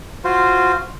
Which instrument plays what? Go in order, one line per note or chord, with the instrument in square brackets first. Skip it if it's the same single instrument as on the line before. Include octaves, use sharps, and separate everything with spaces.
[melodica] F4 F#4 C5